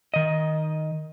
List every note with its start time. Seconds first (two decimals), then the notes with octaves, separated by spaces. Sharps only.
0.14 D#3 D#5